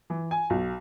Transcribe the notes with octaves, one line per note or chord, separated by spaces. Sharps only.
E3
G#5
B1